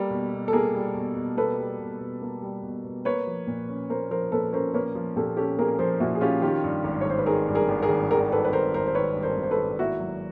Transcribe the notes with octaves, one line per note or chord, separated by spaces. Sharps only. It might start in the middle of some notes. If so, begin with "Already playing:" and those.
Already playing: G3 A#3 G4 A4
B2
B2
A4
A#3 G#4 A#4
G3
B2
B2
A#3 A4 B4
G3
B2
B2
A#3
G3
B2
B2
A#3 B4 C#5
F3
A#2
C#4
A#3 A#4 C5
F3 A#4 C5
A#2 A4 B4
C#4 A#4 C5
A#3 B4 C#5
F3
A#2 G4 A4
C#4 G4 A4
A#3 G#4 A#4
F3 A#4 C5
A#2 E4 F#4
G#4
C#4 F4 G4
D#3 F4 G4
G2
G#1
C#5
G#1 C5
B4
D#3 G#4 A#4
G2
G#4 A#4
G#1
G#4 A#4
G#1
D#3 G#4 A#4
G2 A4 B4
B4
G#1 A#4 C5
G#1 A#4 C5
C5
D#3 B4 C#5
G2
A#4 C5
G#1
C5
A4 B4
G#1
A#3 E4 F#4
F#3